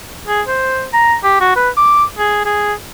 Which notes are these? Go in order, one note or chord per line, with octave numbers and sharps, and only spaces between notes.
G#4
C5
A#5
G4
F#4
B4
D6
G#4
G#4